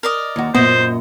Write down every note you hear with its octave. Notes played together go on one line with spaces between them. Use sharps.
A#4 D5 D#5
D#2 F#4
F#2 A#2 B3 C5 D#5